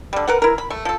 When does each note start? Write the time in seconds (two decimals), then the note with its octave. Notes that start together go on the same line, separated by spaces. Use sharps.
0.13 D3 G3
0.28 A#4 B4 F#5
0.42 E4 A#4
0.58 B5
0.70 A3
0.85 F3 A4